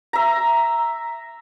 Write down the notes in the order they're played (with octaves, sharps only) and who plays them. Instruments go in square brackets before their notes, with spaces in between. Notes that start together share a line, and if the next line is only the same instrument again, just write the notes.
[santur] E5 A#5